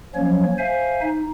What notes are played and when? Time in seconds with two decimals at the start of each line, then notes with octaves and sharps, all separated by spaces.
0.15 F3 F#3 A#3 C#4 C#5
0.58 C5 E5 F5 G#5
1.01 D#4